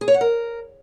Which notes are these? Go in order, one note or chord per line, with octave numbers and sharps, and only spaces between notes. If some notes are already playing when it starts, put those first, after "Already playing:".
G#4
C#5
F#5
A#4